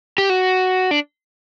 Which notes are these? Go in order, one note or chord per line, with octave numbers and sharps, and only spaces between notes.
G4
F#4
D4